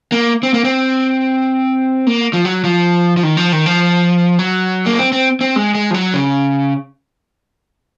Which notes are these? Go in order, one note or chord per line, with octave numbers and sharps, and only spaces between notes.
A#3
C4
A#3
C4
A#3
F3
F#3
F3
F3
D#3
F3
D#3
F3
F#3
A#3
C4
C4
C4
G#3
G#3
F3
F#3
C#3